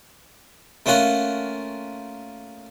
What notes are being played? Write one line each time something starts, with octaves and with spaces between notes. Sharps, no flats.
A3 A#3 C#4 F4 F#5